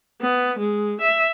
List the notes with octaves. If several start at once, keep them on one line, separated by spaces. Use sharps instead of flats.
B3
G#3
E5